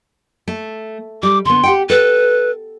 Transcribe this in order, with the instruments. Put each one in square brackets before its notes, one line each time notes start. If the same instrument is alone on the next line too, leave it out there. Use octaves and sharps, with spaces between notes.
[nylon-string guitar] A3
[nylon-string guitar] G3 [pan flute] D6
[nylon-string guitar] D3 B3 [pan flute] C6
[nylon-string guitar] G4 F#5 G5
[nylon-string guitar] A4 [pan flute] B4